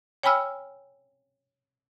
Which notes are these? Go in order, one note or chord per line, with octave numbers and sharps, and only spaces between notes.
C#5 G5 G#5 B5 E6 F6